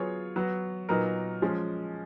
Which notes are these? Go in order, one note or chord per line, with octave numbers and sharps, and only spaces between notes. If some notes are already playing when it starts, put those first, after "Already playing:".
Already playing: F#3 B3 F4 G#4 C#5
F#3 B3 F#4
A#2 F#3 B3 D#4 A#4
F3 G#3 C#4